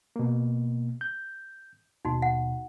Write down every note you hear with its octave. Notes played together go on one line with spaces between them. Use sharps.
B2 A#3
G6
D#2 B2 D#4 F#4
F#5